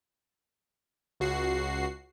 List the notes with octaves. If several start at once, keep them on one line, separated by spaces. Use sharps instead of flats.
C#2 F#4 C7